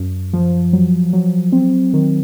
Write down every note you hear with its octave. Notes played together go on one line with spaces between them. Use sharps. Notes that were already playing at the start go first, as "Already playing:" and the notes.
Already playing: F#2
F3
F#3
F#3
C4
D#3